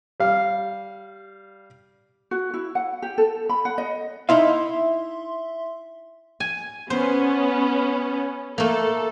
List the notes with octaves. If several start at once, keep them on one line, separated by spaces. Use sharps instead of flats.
G3 F5
F#4
E4
F#5
G4
A4
B5
F#5
D#5
D#4 E4 E5 F5 C6
G#5
B3 C#4 C5
A3 A#3 A4